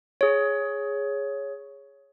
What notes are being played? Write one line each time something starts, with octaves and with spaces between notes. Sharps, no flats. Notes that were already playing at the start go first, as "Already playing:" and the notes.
G#4 C#5